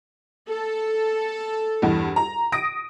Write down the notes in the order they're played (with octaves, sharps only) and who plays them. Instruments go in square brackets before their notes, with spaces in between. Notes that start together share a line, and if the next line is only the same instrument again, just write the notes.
[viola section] A4
[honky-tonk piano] E2 G2
A#5
D#6 A#6 D7